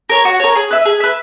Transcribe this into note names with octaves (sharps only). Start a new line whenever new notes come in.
A#4 C#5
F#4
A#4 C#5
G#4
B4 E5
G#4
B4 E5